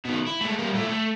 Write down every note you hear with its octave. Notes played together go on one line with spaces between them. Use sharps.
B2 D#3
E4
G#3 A3
G3 A#3
A#2 A3
A3